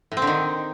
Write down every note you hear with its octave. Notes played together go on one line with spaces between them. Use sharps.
A2
C4
D3
D#3